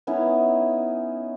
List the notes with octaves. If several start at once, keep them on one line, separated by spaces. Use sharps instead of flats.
B3 C#4 D#4 E4